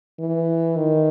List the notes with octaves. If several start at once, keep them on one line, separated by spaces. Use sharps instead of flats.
E3
D#3